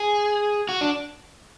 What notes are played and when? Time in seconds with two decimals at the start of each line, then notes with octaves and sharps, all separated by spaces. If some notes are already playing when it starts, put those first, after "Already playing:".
Already playing: G#4
0.69 F#4
0.81 D4